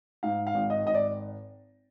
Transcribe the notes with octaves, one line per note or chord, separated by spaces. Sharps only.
G#2 F5
F5
G#1
D#5
G#1 D#5
D5